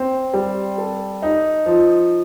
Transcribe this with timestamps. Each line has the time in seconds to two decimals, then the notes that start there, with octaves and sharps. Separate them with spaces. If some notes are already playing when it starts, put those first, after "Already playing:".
Already playing: C4
0.34 G3
0.78 A4
1.22 D#4
1.66 F3